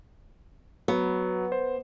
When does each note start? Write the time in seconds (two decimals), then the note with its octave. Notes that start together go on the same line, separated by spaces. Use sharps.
0.88 F#3 B3
1.52 C5